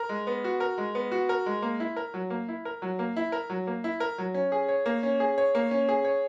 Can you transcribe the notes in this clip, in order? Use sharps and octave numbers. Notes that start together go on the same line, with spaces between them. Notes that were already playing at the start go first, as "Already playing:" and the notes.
Already playing: A#4
G#3
B3
F#4
A#4
G#3
B3
F#4
A#4
G#3
A#3
E4
A#4
F#3
A#3
E4
A#4
F#3
A#3
E4
A#4
F#3
A#3
E4
A#4
F#3
C#4
G#4
C#5
A#3
C#4
G#4
C#5
A#3
C#4
G#4
C#5